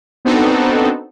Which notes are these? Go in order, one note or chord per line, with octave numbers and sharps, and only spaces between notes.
B3 C4 D4 D#4 F#4 A4